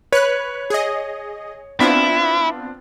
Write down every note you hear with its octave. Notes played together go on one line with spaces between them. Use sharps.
B4 C#5 F#6
G#4 D#5
B3 C4 D4 E4 F4